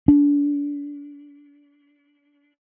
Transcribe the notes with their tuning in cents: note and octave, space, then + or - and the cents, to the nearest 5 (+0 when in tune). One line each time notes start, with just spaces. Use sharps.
D4 -30